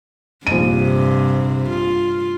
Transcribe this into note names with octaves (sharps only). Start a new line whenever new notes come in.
A#1 G2 C3 D#7
F4